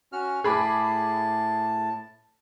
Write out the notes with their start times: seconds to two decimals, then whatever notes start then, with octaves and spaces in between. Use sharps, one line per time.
0.13 C#4 F#4 F6
0.44 A2 G#4 A5 B5 D6